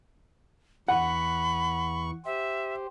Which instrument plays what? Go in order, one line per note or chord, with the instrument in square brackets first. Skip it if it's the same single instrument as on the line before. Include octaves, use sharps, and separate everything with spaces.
[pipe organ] E2 E3 C#6 [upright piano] F#5 [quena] B5
[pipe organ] G4 C5 [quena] E5